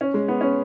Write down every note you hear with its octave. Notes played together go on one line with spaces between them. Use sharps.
C#4
G#3
B3
C#4